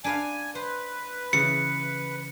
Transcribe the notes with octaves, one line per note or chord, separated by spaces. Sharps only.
D4 B4 F5 G#5
B4 C5
C#3 E3 C#7